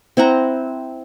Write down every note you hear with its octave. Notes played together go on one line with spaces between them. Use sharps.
C4 E4 F#5 A#5